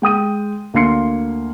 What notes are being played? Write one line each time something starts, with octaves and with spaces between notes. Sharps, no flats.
G#3 G5 D#6 D#7
D2 A#3 F5 C6 C7 C#7